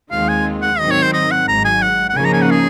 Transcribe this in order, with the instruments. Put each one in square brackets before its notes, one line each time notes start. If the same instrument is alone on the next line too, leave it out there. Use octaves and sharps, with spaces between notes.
[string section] D#2 D#3 G#3 C4 F4 [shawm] F5
[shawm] G#5
F#5
[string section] G#2 D#3 F#3 C4 [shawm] D#5
[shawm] C#5
C5
D#5
F#5
[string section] G#1 G#2 F#3 [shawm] A#5
[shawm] G#5
F#5
F#5
[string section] C#3 F3 A#3 D#4 [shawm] G#5
[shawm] A#5
G#5
F#5
G#4